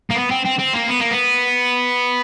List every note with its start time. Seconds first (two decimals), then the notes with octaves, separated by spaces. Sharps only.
0.11 A#3
0.16 B3
0.31 C4
0.46 C4
0.59 C4
0.74 A#3
0.88 B3
1.00 A#3
1.11 B3